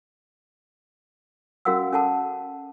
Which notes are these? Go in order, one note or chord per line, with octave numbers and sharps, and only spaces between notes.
C#4 F#4 A#4 F5 F#5 E6
C#4 A4 F#5 A5